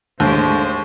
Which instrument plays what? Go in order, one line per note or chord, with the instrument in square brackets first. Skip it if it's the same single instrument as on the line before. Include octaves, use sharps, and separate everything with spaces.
[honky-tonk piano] D#2 [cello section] A2 G#3 G4 [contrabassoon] D3 [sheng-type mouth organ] C5